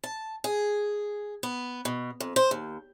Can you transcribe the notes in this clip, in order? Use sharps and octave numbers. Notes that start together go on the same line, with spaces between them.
A5
G#4
B3
B2
F2
C5
D#2